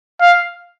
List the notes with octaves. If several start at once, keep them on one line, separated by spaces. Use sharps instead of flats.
F5